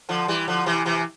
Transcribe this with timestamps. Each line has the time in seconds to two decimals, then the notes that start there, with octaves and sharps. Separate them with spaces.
0.09 D3 F3
0.28 E3 G3
0.48 D3 F3
0.66 C3 E3
0.86 C3 E3